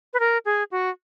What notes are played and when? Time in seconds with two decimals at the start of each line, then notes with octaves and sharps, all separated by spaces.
0.14 B4
0.20 A#4
0.45 G#4
0.71 F#4